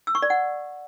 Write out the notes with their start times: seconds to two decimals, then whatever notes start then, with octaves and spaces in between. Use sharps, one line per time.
0.07 E6
0.15 C#6
0.22 D5
0.30 F#5